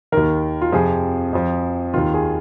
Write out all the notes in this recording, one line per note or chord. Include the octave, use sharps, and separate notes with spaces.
D#2 D#3 A#4
F4
F2 C3 F3 G#4
F2 F3
D#2 D#3 F4
G#4